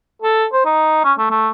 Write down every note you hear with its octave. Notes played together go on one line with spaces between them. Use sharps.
A4
C5
D#4
C#4
A3
A3